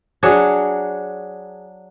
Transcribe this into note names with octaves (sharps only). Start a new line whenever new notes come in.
F#3 D4 G#4 C#5